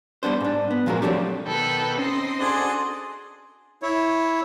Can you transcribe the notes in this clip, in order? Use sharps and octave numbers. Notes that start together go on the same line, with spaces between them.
G3 B3 D4 C5
G#2 D4
B3
A#2 F3 G#3 F#4 A4 A#4
F3 F#3 A3 C4 D4 G4
D#2 B2 A4 B4 G5
C4 C#4 D#4 D#5 C6
D4 F#4 G#4 A4 C6
E4 C#5